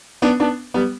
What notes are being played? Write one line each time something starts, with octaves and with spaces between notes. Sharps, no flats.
B3 D4
B3 D4
G3 B3